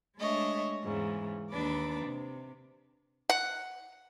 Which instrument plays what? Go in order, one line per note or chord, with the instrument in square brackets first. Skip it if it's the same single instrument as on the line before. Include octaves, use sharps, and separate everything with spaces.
[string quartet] G#3 A3 D4 C#5 D#5 E5
E2 G#2 C#3 E3
D#2 D4 D#4 B4 D6
C3
[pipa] F#5